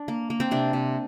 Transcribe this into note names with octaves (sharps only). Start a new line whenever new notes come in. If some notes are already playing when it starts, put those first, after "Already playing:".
Already playing: D4
A#3
A#3
C4
C3 D4
C3